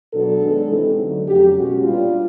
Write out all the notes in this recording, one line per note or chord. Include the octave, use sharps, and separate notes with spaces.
B2 F#3 B3 D4 A4
D#3 G#3 B3 D4
C3 E3 G#3 C4 D#4
D3 F#3 A3
F2 C#3 F#3 G4
B2 G#3 C#4 F#4
A#2 G3 B3 D4 F4